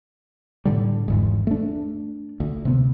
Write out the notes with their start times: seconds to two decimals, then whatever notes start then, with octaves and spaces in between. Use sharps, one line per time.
0.65 A2 D3 G3
1.08 G#1 E2 G#2
1.47 A3 D4
2.40 D2
2.65 C3 B3